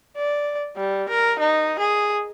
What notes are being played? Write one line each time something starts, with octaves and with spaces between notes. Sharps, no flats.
D5
G3
A#4
D#4
G#4